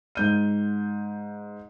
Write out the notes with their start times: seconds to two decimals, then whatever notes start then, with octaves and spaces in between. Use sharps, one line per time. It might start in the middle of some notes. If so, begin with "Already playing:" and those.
0.15 G#2 G6 D#7